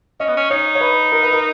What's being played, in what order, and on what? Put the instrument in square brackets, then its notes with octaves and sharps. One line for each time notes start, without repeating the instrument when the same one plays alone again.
[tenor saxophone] C#4 [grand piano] D#5
[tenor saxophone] B3
C#4
[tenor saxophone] D#4 [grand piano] C#5
[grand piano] C#5
B4
A#4
B4
A#4